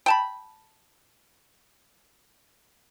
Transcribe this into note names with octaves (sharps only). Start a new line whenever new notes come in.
G5 A5 B5